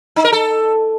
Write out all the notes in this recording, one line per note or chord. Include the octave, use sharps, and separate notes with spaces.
D#4
A#4
A4